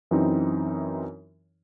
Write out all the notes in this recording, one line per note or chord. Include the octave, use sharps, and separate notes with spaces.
F#2 E3 C4 D#4